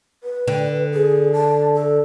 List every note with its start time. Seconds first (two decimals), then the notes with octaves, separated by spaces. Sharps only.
0.23 B4
0.48 D3
0.94 G#4
1.33 A5
1.75 A4